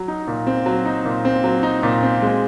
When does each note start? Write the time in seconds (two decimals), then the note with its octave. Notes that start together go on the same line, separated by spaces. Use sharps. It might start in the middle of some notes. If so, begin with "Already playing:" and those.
Already playing: F#3
0.08 D#4
0.27 A#2
0.47 C4
0.66 F#3
0.85 D#4
1.05 A#2
1.25 C4
1.44 F#3
1.63 D#4
1.83 A#2
2.03 C4
2.22 G#3